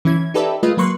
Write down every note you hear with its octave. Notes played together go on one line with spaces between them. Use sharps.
E3 C#4 E4 G#6
D#4 G4 A4 B4 D5 E5
G#3 A3 F4 B4 D#5
F#3 A#3 B4 C6 C#6 F#6